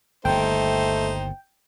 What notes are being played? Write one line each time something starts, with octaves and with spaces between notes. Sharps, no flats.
G1 D#2 A3 D#4 C5 G5